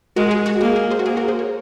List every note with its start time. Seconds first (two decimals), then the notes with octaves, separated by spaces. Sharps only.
0.16 G#3 F#4 A#4
0.31 G#4
0.46 F#4
0.61 A#3 G#4
0.76 G#4
0.91 G#4 C5
0.99 F#4
1.06 A#3 G#4
1.17 F#4 A#4
1.28 G#4 C5
1.39 A#4 C#5